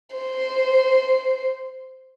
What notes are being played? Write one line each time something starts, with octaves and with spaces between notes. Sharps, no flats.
C5